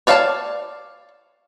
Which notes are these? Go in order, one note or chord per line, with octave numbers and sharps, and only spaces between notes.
C#5 D5 F5 G5 A5